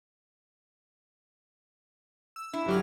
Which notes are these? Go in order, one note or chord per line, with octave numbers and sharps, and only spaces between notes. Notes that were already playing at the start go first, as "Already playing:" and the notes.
E6
D4 E4
G1 F#3 G4 F6